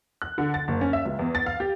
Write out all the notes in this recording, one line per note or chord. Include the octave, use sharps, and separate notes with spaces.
F#6
D3
A6
F#1
C#4
E5
C#2
E2
A6
F5
G4